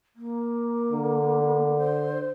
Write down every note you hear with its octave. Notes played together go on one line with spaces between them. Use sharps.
A#3
D3
C5